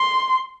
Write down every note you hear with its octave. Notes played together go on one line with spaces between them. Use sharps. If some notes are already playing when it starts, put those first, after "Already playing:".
Already playing: C6